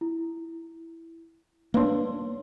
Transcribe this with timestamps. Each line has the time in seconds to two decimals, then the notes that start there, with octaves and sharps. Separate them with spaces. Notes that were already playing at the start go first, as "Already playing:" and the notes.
0.01 E4
1.74 A#3 D4 B4 C#5 C6